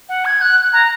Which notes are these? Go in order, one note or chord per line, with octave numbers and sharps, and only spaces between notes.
F#5
G#6
F#6
A#5